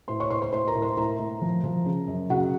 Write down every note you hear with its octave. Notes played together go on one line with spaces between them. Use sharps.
A2 C5 C6
C#5 C#6
A2 C5 C6
C5 C6
A2 C5 C6
A#4 A#5
A2
C5 C6
A2 A#4 A#5
A2
F3
F3
C#3
F#2
C#3 F#4 F#5